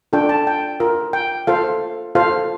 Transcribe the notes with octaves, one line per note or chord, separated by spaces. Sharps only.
D4 F4 A4 G5
A5
G5
F4 A#4
G5
F4 A4 C5 F5
F4 A4 C5 F5